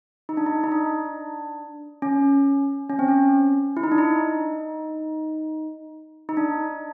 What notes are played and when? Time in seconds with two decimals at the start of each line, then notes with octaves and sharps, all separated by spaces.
0.29 D#4
0.37 D4
0.46 D#4
0.64 D#4
0.72 D4
2.02 C#4
2.90 C#4
2.99 C4
3.08 C#4
3.77 E4
3.84 D#4
3.92 D4
3.98 D#4
6.29 D#4
6.37 D4